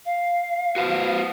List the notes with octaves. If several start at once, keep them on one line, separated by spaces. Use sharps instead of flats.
F5
F#4 B4 C5